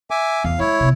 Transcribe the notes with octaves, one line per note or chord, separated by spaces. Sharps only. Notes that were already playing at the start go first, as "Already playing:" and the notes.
E5 G#5 D6
E2 F5
G#3 E4 C#5
C3 B3